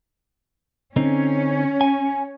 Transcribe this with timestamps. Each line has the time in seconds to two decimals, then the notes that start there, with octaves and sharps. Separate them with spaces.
0.96 D3 C4 C#4 D#4
1.81 G#5